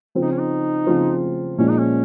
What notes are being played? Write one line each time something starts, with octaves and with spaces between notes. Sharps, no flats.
C#3 F3 C4 F4 C5
D#4
C#4
D#4
C#3 F3 C4 F4 C5
A#2 F3 G#3 C#4
D#4
C#4